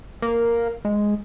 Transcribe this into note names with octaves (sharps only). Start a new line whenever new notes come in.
A#3
G#3